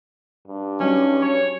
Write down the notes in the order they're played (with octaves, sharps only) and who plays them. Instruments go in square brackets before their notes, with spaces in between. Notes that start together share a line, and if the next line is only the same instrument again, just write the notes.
[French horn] G2
[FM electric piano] F#3 G3 D#4 [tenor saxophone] C#4
[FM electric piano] F#3 [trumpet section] C#5